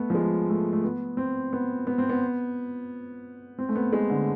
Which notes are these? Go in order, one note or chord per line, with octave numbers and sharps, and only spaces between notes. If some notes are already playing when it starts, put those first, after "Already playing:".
Already playing: A3 B3
F3
G#3
A3
A3
B3
C4
B3
B3
C4
B3
C4
A3
B3
G#3
D3